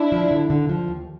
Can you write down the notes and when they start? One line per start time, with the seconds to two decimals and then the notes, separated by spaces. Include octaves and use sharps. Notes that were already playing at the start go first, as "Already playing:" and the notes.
Already playing: D4 E4
0.12 F3
0.31 D3
0.50 D3
0.69 F3
0.88 D#2